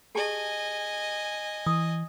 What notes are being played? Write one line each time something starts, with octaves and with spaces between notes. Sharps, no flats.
G4 G#4 D#5 G#5 A5
E3 D#6